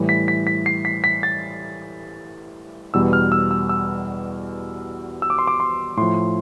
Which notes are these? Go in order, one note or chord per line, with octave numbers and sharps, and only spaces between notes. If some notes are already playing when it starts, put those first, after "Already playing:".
Already playing: A2 E3 G3
B6
B6
B6
C7
B6
B6
A6
E2 B2 G3 E6
F6
E6
E6
E6
E6
D6
C6
D6
C6
A2 F3 C6